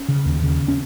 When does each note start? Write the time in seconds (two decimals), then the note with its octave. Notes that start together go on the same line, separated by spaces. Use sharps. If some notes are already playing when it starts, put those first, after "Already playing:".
Already playing: C#4
0.09 C#3
0.26 D#2
0.43 C#3
0.68 C#4